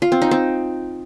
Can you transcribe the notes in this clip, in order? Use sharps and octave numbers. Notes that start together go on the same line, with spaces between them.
F4
C4
D#4
C4